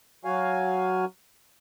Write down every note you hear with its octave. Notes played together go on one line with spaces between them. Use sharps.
F#3 F#4 F5 G#5